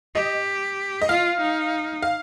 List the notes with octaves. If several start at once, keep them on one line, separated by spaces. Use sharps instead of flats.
G4 D#5
D#5
F4 F5
D#4
F5